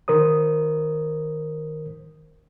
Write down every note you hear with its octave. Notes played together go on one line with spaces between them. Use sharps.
D#3 A#4 C5 D#6